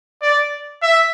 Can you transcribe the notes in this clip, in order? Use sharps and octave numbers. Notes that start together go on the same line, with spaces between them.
D5
E5